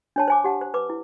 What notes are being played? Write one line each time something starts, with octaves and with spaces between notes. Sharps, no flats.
D4 C#5 A5
C5 G#5 D6
G4 F#5 A5
C5
B4 D6
E4